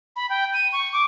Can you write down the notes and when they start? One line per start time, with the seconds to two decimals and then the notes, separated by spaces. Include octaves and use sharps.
0.16 B5
0.30 G5
0.54 D#7
0.72 C#6
0.93 D6